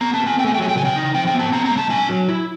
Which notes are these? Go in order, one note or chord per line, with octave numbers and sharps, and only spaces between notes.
B3 A#5
A5
B3
G#5
A3 G5
G#5
G5
F#3 G#5
G5
C#3 G#5
G5
D#4
F3 G5
G5
B3
A5
C#4 A#5
A#5
G#3
A5
D4 G#5
F#3
E4